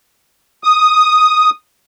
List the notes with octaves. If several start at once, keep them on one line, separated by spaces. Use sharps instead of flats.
D#6